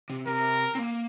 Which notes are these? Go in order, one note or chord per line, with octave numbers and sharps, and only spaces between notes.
C3
C3 A#4
C4
A#3